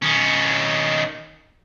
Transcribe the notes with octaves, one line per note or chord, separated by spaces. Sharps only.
D#3 C#4